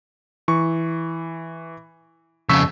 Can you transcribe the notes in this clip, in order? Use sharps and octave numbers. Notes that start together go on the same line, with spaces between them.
E3 C#6
F2 C#3 C#6 E6 B6